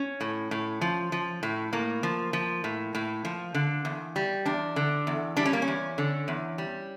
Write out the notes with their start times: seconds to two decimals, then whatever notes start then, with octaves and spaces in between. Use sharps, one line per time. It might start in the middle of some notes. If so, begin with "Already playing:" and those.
Already playing: C#4
0.21 A2
0.51 A2
0.81 F3
1.12 F3
1.43 A2
1.73 A2 A#3
2.03 F3
2.33 F3
2.64 A2
2.95 A2
3.25 F3
3.55 D3
3.85 E2
4.16 G3
4.46 E2 D4
4.76 D3
5.07 E2
5.37 G3 D4
5.46 C#4
5.53 A#3
5.62 C#4
5.68 E2
5.98 D3
6.28 E2
6.58 G3